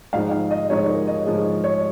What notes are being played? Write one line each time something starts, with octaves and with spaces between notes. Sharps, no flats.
G#2 F3 G#3 D#4 F5
F5
D#5
G#2 F3 G#3 D#4 C#5
A#4
D#5
G#2 F3 G#3 D#4 G#4
C#5